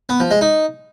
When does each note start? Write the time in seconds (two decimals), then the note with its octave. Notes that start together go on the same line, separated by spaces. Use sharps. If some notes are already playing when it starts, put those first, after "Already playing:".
0.09 B3
0.20 F3
0.31 G#3
0.41 D#4